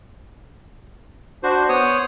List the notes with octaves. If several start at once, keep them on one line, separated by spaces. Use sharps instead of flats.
D4 F#4 C5
B3 C5 C#5 F#5 D#6